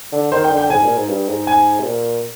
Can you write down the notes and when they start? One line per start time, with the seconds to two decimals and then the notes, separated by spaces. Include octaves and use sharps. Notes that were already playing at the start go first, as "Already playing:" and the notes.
0.12 D3
0.32 D#3 C5
0.44 G5
0.51 D3
0.57 G5
0.70 G#2 G#5
0.84 A#2
0.96 G#2
1.09 G2
1.29 G#2
1.47 G#5
1.79 C3
1.86 A#2